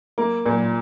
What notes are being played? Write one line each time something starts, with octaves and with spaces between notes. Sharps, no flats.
A#3
A#2